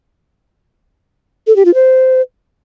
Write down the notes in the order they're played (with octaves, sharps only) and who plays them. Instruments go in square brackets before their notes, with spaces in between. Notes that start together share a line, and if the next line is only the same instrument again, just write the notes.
[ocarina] A4
G4
F4
C5